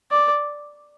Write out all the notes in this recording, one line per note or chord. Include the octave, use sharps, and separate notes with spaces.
D5